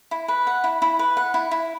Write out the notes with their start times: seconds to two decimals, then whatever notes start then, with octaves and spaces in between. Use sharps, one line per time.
0.11 E4
0.28 B4
0.47 F#5
0.64 E4
0.82 E4
0.99 B4
1.17 F#5
1.34 E4
1.51 E4